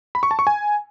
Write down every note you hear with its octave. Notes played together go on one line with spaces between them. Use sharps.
B5
C#6
A5
C#6
G#5